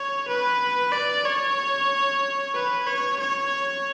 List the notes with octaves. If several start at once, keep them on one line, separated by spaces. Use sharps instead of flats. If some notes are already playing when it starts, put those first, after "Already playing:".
Already playing: C#5
B4
D5
C#5
B4
C#5
C#5